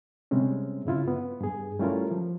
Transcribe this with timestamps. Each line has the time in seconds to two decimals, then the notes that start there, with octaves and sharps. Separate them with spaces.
0.31 C3 G3 G#3 C4 C#4
0.85 G2 C#3 E4 F4
1.08 B3
1.40 G2 G#4
1.79 G3 A3 C#4 E4 F4 A#4
2.11 F3